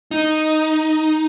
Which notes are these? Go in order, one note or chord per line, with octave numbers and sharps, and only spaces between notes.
D#4